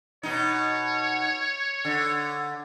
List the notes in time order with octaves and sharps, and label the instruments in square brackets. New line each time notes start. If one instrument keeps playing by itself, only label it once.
[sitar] B2 D#4 [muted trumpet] C#5
[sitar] D3